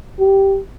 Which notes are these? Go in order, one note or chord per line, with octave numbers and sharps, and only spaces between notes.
G4